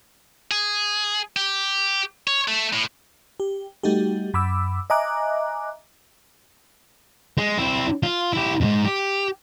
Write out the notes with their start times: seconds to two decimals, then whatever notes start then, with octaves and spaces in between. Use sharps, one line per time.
0.51 G#4
1.36 G4
2.28 C#5
2.48 A3
2.73 A2
3.40 G4
3.83 G3 A3 D#4 F#4 G4
4.34 F#2 B5 D6 E6
4.90 D#5 E5 G#5 A#5 D6 F#6
7.38 G#3
7.58 C4 E4
8.03 F4
8.33 E4 G4
8.61 F2 G#2
8.85 G4